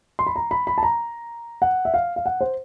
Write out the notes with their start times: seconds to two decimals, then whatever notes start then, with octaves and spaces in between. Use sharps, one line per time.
0.19 C6
0.27 B5
0.36 A#5
0.51 B5
0.67 B5
0.78 A5
0.83 A#5
1.62 F#5
1.85 E5
1.94 F5
2.16 F5
2.26 F#5
2.41 C5